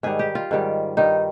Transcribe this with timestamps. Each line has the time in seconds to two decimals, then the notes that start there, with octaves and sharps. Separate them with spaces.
0.03 G#2 D#3 G3 G#4
0.19 G4
0.35 F4
0.51 G#2 D#3 G3
0.97 G2 D#3 G3 D#4